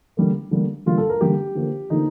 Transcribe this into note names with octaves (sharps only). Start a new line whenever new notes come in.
D3 G3 A#3
D3 G3 A#3
D3 G3 A#3 F4
A4
A#4
D3 G3 A#3 G4
D3 F3 A#3
D3 F3 A#3 D#4